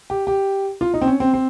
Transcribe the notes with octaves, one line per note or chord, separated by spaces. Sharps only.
G4
G4
F4
D#4
C4
C#4
C4
C4